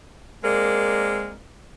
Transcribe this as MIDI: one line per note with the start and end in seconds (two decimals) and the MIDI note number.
0.44 1.35 56
0.44 1.35 58
0.44 1.35 60
0.44 1.35 70
0.44 1.35 74